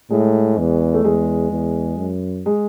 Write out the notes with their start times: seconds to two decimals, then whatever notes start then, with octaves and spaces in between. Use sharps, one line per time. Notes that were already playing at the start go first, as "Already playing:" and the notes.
0.10 A2 G#3
0.58 E2
0.94 A3
1.04 E2 G#3
1.51 E2
1.98 F#2
2.46 G#3